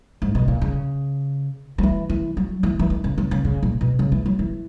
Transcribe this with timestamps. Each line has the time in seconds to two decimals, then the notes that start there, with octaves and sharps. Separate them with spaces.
0.22 G#2
0.35 B2
0.48 A#2
0.62 C#3
1.78 F#3
1.83 E3
2.09 E3
2.37 F#3
2.63 E3
2.79 E3
2.90 D#3
3.04 C#3
3.18 C#3
3.31 C#3
3.45 C#3
3.63 A#2
3.81 B2
3.99 C#3
4.12 E3
4.26 F#3
4.39 E3